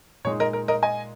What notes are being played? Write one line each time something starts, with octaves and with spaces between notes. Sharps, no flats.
A#2 G#3 D#4 C#5
A#4 D#5
A#4
A#4 D#5
D#5 G#5